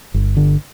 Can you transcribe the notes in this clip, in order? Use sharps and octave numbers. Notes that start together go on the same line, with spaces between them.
G1
D3